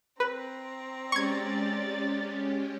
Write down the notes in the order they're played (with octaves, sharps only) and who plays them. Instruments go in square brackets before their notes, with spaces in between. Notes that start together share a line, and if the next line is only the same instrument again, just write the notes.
[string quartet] C4 A#5 [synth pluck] B4
[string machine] G#3 C#4 G4 [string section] D5 A6 [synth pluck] C#6 G#6